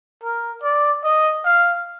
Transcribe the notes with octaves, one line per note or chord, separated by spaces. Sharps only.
A#4
D5
D#5
F5